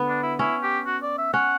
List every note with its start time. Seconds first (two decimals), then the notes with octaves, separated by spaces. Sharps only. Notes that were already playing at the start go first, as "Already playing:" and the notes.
Already playing: D3 B3
0.08 D4
0.23 E4
0.39 C#4 E4
0.63 G4
0.86 F#4
1.03 D5
1.18 E5
1.33 C#4 F#5